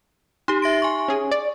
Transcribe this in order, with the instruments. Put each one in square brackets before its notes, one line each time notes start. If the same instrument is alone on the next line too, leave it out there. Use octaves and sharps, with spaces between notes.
[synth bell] D#4 G4 [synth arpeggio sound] C6
[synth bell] E5 A#6 D7
G#5 C#6
[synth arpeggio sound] C#4 G#4
D5